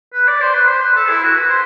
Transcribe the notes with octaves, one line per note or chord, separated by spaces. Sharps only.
B4
D5
C5
B4
C5
B4
A4
E4
F#4
B4
C5